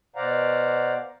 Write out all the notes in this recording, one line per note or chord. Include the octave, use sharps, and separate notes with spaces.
B2 C5 D5 F5 F#5 A#5